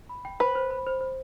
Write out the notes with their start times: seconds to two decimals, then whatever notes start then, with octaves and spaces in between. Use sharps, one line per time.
0.09 B5
0.25 G5
0.40 B4 C5
0.55 C5
0.71 B5
0.87 C5
1.01 C5